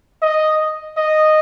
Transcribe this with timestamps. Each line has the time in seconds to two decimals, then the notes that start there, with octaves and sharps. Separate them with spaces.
0.22 D#5
0.97 D#5